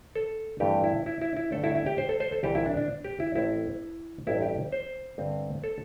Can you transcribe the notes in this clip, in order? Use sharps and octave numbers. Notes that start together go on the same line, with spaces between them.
A4
G2 E3 A3 C4 G4
E4
E4
E4
E4
G2 D3 A3 C4 A4
E4
E4
G4
C5
A4
C5
A4
C2 C3 E3 C4 G4
E4
D4
D4
G4
E4
A1 A2 A3 C4 E4
A1 G2 G3 E4
G4
C5
G2 D3 C4
A4